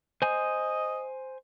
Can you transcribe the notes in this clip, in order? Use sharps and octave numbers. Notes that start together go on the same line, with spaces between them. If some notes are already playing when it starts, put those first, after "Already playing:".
C5 D#5 G#5